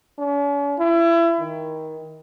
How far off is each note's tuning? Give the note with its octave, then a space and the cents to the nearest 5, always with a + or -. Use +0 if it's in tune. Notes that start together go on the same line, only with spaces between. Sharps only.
C#4 +45
E4 +30
D#3 +20